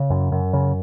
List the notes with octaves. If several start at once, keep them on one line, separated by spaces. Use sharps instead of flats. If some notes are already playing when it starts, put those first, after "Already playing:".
Already playing: C#3
F#2
F#2
C#3